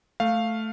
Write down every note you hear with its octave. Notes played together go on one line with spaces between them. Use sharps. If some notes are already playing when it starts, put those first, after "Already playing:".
A3 F5